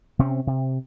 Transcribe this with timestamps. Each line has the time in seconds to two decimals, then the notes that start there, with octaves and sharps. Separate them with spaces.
0.19 C3 C4 C#4
0.47 C3